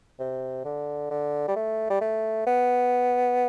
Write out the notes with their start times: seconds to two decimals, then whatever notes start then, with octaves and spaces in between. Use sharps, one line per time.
0.20 C3
0.65 D3
1.11 D3
1.48 G3
1.56 A3
1.90 G3
2.01 A3
2.47 B3